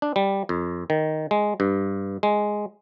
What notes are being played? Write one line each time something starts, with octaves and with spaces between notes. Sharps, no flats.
D4
G3
F2
D#3
G#3
G2
G#3